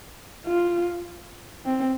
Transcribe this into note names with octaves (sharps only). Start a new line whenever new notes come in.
F4
C4